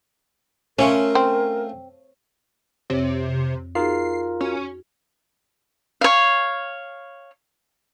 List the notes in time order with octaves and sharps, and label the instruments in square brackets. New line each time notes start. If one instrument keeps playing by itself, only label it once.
[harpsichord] A3 F4 E5 [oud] C#4 [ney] A#4
[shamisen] C4
[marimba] F2 C4 C#5 [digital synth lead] C3
[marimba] D#4 F#4 G#4 [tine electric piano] F4 A#4 [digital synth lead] C7
[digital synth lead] C#4 [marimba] F#4
[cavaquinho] C#5 F5